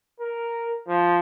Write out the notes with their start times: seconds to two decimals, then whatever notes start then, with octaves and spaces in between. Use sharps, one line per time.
0.20 A#4
0.88 F3